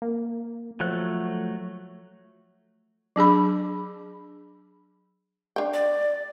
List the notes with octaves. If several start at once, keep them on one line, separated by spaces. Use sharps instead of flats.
A#3
F3 F#3 A3 F#6
F#3 D4 G#4 B5
D4 G5
D5